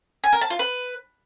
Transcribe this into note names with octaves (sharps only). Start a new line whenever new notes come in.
G#5
A#4
A5
F4
B4